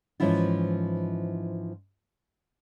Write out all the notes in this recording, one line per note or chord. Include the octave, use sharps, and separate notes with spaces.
G#2 E3 F3 C#4 E4 F4